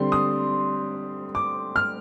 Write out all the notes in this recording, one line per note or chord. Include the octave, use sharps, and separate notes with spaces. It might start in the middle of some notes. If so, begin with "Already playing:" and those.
Already playing: D3 G3 C4 C6
D#6
D6
F6